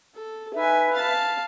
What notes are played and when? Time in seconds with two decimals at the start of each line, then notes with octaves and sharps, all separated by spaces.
0.14 A4
0.54 D#4 B4 E5 G#5
0.92 F5 A5